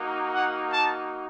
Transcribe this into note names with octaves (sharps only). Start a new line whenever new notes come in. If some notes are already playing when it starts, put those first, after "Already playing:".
Already playing: A#3 D#4 F#4
F#5
A5